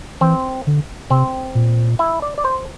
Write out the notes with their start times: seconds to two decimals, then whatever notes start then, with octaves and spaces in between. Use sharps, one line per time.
0.21 E3 C4
0.67 D3
1.10 C3 C4
1.55 A#2
1.99 E4
2.22 D5
2.38 D5
2.45 C5